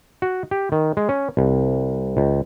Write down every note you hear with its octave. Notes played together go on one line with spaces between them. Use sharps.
F#4
G4
D#3
G#3
C#4
C2
C#2